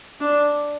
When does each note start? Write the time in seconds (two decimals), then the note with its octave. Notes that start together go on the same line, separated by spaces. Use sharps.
0.21 D4